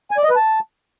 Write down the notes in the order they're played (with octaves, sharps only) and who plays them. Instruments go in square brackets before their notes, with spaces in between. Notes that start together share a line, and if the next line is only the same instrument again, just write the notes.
[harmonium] G#5
D5
D#5
B4
A5